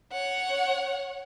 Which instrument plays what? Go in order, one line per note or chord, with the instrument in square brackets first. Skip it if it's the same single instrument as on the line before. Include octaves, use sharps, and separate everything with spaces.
[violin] C#5 F#5